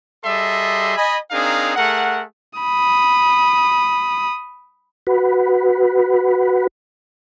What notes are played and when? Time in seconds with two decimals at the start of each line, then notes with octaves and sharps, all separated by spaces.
0.24 G3 G#4 A4 D#5 E5 C6
0.97 D#5 G#5 B5
1.31 C4 D4 D#4 G#4 A#4 F5
1.76 A3 G#4 A#4 F#5
2.59 B5 D#6
5.07 F#4 B4